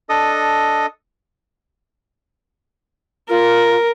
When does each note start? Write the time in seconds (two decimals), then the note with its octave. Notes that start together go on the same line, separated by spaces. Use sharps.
0.09 D4 A4 D#5 D#6
3.29 F4 A#4